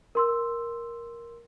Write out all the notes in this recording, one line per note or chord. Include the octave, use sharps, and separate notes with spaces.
A#4 C6 E6